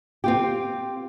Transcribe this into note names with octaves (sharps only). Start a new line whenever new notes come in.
C4 F4 G4